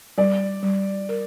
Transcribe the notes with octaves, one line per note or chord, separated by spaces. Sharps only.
G3 D5
G3
A#4